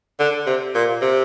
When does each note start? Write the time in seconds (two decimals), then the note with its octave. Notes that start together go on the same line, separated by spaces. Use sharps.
0.20 D3
0.47 C3
0.75 A#2
1.02 C3